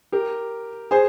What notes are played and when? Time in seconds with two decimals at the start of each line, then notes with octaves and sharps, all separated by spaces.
0.12 G4 A#4
0.91 G#4 C5